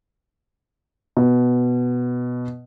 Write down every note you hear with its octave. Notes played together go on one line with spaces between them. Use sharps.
B2